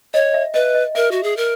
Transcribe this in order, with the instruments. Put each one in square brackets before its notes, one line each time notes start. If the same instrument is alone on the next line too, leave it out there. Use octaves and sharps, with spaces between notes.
[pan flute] C#5 [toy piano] D#5
[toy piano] E5
[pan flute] B4 [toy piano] D#5
[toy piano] D#5
[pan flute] A#4 [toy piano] E5
[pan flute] F#4
G#4
A#4